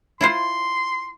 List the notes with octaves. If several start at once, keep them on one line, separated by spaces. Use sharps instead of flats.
E4 F4 C5 C6